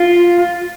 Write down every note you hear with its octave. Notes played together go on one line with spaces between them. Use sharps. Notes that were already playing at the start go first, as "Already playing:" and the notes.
Already playing: F4